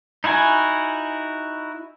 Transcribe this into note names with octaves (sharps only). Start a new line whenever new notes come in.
D#4 E4 F#4 G#5